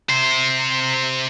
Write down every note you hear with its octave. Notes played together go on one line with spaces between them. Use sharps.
C3 C5